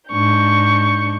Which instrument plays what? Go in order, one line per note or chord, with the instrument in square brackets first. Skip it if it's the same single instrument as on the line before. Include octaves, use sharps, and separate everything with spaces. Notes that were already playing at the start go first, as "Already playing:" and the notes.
[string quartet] G#2 D4 C#6 G6